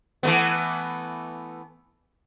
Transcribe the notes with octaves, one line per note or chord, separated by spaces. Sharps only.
E3 A3 B3